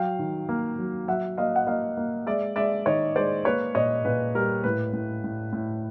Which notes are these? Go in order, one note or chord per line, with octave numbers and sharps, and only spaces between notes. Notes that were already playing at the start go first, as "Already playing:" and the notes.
Already playing: F#3 F5 G5
D#3
A#3
F#3
F#3 E5 F#5
A#3 D#5 F5
F#5
A#3 D#5 F5
A#3
G#3 D5 E5
G#3 D5 E5
D#3 C#5 D#5
G#3 C5 D5
A#3 B4 C#5
A#2 C#5 D#5
A#2 B4
G3 A#4
A2 B4
A2
A2
A2